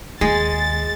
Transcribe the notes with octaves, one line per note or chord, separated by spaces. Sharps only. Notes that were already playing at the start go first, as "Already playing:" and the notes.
D#2 G#3 G#4 A6